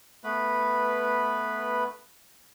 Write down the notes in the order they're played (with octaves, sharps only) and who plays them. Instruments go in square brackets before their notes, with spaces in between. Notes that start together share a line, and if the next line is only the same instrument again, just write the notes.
[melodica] A3 B3 B4 B5